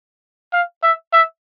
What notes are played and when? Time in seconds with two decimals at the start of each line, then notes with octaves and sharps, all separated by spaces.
0.53 F5
0.83 E5
1.13 E5